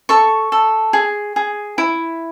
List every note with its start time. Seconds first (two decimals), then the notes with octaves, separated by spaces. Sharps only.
0.09 A4 C#6
0.52 A4
0.93 G#4
1.36 G#4
1.78 E4